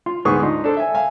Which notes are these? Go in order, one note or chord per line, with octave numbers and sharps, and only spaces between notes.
F4
D2 G#2 B3 G#4 C#6 D#6
D4 D#4 F4
D4 A4 C5
E5 G#5
E5 F5 G#5